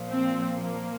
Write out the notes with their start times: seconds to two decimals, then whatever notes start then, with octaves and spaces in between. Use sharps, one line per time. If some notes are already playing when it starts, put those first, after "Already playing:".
Already playing: A#2 F3
0.10 C4
0.57 A#3